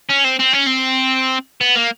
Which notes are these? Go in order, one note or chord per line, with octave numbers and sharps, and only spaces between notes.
C#4
C4
C4
C#4
C4
B3
A#3